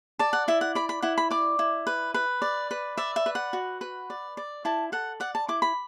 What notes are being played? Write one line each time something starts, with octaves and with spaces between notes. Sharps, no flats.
D5 A5
F#5
E4 E5
F#5
D5 B5
B5
E4 F#5
B5
D5 D6
E4
B4
B4
D5
B4
D5 E5
E5
B4
F#5
F#4
B4
D5
D5
E4 A5
A4 F#5
D5 F#5
A5
E4 D6
B5